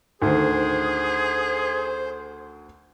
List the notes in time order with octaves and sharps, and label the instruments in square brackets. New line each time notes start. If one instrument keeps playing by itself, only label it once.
[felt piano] D2 D#3 [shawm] G#4 [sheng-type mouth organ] C5